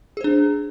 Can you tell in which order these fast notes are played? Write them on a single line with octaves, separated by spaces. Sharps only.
G#4 C5 D4